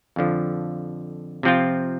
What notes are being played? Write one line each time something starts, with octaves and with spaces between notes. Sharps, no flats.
F2 D3 F3
C3 F3 C4 F4